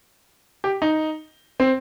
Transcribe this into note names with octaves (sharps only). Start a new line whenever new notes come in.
G4
D#4
C4